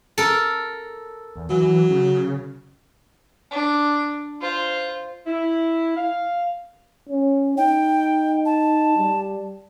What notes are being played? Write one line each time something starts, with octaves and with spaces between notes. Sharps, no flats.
A4 A#4
E2
E3 F#3
C#3
D4
F4 C5
E4
F5
C#4
D#4 G5
A5
G3